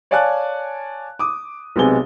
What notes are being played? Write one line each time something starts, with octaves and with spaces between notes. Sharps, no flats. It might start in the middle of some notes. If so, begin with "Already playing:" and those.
C#5 D5 F5 G#5 A5 F#6
D6 D#6
B1 C3 G#3 B3 G#5 G7